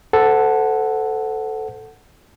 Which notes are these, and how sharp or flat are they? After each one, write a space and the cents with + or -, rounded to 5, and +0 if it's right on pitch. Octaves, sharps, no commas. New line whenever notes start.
A4 +0 C5 -35 F#5 +0